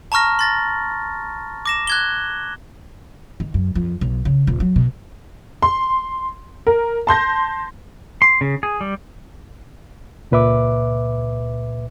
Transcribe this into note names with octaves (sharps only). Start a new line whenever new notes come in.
A5 A#5 C#6 F6 A#6
C6 A6 A#6
D6 A#6 E7
F#6 G#6 G7
D#3
F#2
F2
B1
C#3
D#1
F#3
B2
C6
A#4
A5 C6 G6 A#6
C6
C#3
G#4
G3
C#2 A#2 B4 E5 D6